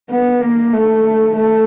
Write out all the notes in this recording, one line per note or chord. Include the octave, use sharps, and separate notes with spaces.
B3
A#3
A3
A3